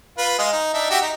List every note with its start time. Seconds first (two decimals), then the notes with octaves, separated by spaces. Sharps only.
0.18 F4 B4
0.39 G#3 D#5 F5
0.52 D#4
0.74 D4 D#4 E5
0.90 F#4 G4 E5
1.02 D#4